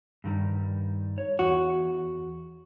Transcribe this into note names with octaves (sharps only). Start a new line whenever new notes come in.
G2 D#3 G3
C#5
E2 F#4